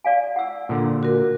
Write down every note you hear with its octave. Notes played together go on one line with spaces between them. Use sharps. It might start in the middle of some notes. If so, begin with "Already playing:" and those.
D5 F5 G#5
F#5 E6
A#2 D3
F#4 A#4